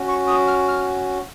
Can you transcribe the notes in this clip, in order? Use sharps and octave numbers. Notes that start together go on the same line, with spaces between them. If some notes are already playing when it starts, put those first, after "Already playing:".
Already playing: C#4 F#4
C#6
D#6
F6
F6